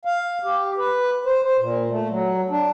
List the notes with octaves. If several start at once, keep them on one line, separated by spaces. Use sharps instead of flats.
F5
G4
B4
C5
C5
A#2
A3
F#3
D4